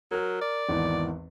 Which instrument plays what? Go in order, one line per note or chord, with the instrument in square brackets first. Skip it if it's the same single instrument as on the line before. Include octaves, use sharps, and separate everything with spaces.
[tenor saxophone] F#3 [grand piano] A#4 F6
[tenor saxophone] D5
[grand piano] G#1 E2 E3